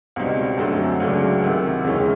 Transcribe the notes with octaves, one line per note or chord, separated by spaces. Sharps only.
C#2 B2 G3 C4 D#4
F#2 D3 F#3 A3 C4
C#2 C#3 F#3 A3 D4
C2 C3 D#3
D#2 C#3 E3 G#3 C#4